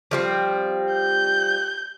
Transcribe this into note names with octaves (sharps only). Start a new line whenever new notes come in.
F3 G3 C4
G6